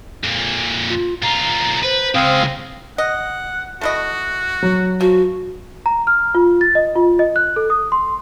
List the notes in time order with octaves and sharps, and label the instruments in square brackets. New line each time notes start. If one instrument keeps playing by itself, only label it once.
[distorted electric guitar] F2 A#2
[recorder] F4
[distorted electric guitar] B1 F4 [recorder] A#5
[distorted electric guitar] B4 [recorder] C5
[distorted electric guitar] C#3 G#3 [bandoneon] C4 F5 D#6
[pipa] D#5 [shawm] F#5
[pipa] A3 E4 D#5 [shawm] F#4
[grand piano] F#3
[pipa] F3 [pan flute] F#4
[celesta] A#5
F6
F4
A6
D#5
F4
D#5
F#6
A4
D#6
C6